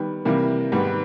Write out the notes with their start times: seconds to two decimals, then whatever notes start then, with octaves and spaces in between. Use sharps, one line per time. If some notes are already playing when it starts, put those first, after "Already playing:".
Already playing: D#3 G3 B3
0.25 C3 E3 G3 A#3
0.72 G#2 D#3 G3 B3